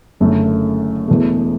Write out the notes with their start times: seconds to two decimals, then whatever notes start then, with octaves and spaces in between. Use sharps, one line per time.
0.20 F#1 F#2 D3 A3
1.08 E1 E2 B2 A3